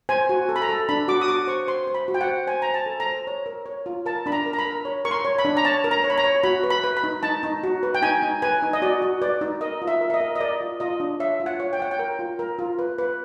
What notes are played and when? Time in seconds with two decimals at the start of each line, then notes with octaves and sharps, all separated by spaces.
0.09 C5 G#5
0.29 F#4
0.49 A4
0.56 B5
0.62 A#5
0.69 A4
0.89 D4 B5
1.08 F#4 D6
1.21 D#6
1.28 F#4 D6
1.47 C5 C#6
1.67 C5 C6
1.87 C5
1.94 B5
2.08 F#4
2.14 G5
2.21 F#5
2.27 C5
2.47 C5 G#5
2.62 C5 A#5
2.74 A5
2.86 A4
3.00 A#5
3.06 C5
3.27 C#5
3.46 A#4
3.66 C#5
3.86 F4
4.06 A#4 A5
4.26 D4 B5
4.32 A#5
4.46 A#4
4.53 A#5
4.59 B5
4.65 A#4
4.85 C#5
5.05 A#4 C#6
5.11 C6
5.25 C#5
5.39 B5
5.45 D4
5.57 A#5
5.65 C#5 A5
5.84 A#4
5.91 A#5
6.04 C#5
6.10 B5
6.18 A#5
6.24 C#5
6.44 F#4 B5
6.64 B4
6.70 B5
6.84 B4
6.97 B5
7.04 D#4
7.23 D#4 A5
7.43 D#4
7.63 F#4
7.83 B4
7.95 G5
8.02 D#4 G#5
8.23 D#4
8.42 B4 G#5
8.62 D#4
8.73 D#5
8.82 F#4 D5
9.02 F#4
9.22 B4 D5
9.41 D#4
9.61 A#4 D#5
9.82 F4
9.87 E5
10.01 A#4
10.10 E5
10.14 D#5
10.20 A#4
10.35 D#5
10.40 A#4 D5
10.61 F4
10.80 F4 D#5
11.00 D4
11.20 C#5 E5
11.40 F4
11.46 F#5
11.60 C#5
11.73 G5
11.79 C#5 F#5
11.91 G5
11.99 A#4
12.19 F4
12.39 A#4
12.59 F4
12.79 B4
12.98 B4